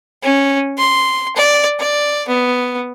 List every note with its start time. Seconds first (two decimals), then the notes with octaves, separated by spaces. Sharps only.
0.23 C#4
0.78 C6
1.36 D5
1.79 D5
2.28 B3